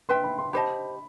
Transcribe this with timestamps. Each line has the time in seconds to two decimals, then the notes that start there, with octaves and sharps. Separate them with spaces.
0.09 B4 E5 G5 C6
0.24 B5
0.39 C6
0.53 G4 C5 D#5 A5 B5